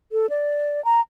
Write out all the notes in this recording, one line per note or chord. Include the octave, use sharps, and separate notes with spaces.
A4
D5
A#5